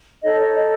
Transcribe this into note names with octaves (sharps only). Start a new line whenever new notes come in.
D#4 A4 C#5 D#5
C#5
D#5